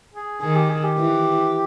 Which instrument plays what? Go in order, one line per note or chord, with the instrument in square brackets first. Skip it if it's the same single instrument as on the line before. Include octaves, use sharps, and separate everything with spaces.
[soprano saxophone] G#4
[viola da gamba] D#3 [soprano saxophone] G#4
[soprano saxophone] G4
G#4
G4
[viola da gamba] E3